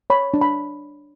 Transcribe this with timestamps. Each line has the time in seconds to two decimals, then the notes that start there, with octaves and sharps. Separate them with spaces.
0.10 C#5 B5
0.34 D4
0.41 B5